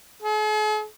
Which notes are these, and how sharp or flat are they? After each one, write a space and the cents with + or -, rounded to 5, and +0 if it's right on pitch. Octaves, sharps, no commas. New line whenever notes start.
G#4 +45